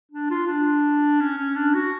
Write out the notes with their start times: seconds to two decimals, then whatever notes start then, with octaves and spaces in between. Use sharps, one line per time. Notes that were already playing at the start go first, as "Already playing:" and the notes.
0.12 D4
0.30 F4
0.47 D4
1.20 C#4
1.37 C#4
1.56 D4
1.74 F#4